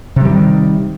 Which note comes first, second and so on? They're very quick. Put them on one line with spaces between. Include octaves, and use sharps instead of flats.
C3 G3 E3 D#3